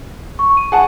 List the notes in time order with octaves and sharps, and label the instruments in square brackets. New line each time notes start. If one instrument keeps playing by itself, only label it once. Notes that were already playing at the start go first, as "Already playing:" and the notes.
[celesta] C#6
D#7
[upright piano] G#4 F#5 A5